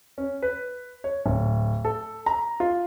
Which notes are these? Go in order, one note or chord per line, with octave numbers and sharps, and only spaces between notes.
C#4
B4
C#5
D1
A4
A#5
F4